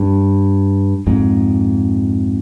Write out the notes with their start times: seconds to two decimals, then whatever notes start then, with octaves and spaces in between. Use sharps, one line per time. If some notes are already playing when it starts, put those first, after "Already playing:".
Already playing: G2
1.07 F2 G#2